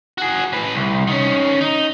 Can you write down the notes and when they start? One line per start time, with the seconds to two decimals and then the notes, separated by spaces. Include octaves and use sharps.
0.18 F#4 G#4
0.53 A2 B4
0.74 C2
1.07 D#3 C#4
1.61 D#4